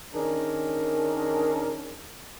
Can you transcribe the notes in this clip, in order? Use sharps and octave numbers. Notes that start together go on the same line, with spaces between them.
D#3 C#4 D4 G#4 A#4